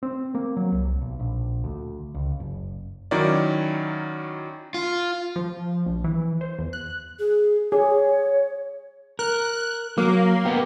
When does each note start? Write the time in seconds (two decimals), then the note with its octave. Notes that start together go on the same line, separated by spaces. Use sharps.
0.03 C4
0.35 A#3
0.57 F#3
0.72 C2
1.02 B1
1.20 A#1
1.64 D2
2.14 C#2
2.40 F#1
3.11 D#3 F#3 C#4 E4 A#4 D5
4.74 F4
5.36 F3
5.86 A#1
6.04 E3
6.41 C5
6.58 E2
6.73 F#6
7.19 G#4
7.72 G#4 C#5
9.19 A#4 F#6
9.98 F#3 A#3
10.45 A#3 B3 G4